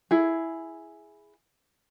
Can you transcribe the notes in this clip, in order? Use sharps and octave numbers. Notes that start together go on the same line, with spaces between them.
E4 G#4